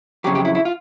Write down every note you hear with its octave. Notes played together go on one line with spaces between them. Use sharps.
F2 C#3 F#3 G4
G4
E4
E4
F4